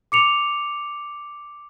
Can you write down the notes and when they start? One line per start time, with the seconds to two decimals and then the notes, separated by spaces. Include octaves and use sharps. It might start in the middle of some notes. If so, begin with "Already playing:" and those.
0.12 D6 C#7 F7